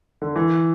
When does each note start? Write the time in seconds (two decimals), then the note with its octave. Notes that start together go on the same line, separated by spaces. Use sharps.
0.22 D3
0.36 E3